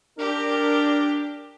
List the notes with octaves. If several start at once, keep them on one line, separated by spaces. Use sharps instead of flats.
D4 G4 A#4